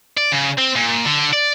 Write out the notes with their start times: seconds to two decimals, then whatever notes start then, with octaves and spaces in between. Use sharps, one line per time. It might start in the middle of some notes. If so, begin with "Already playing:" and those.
0.17 D5
0.32 C#3
0.58 C4
0.76 A#2
1.05 D3
1.33 D5